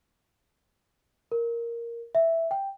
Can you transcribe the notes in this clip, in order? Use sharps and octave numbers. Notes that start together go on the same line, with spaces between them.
A#4
E5
G5